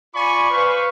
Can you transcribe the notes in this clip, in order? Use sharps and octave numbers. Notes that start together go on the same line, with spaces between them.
F4 D5 G#5 B5 C#6 D6
B4 C5 F5 C#6